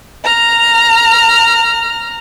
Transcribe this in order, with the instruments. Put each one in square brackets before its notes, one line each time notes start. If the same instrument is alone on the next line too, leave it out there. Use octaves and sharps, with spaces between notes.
[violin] A#5 F6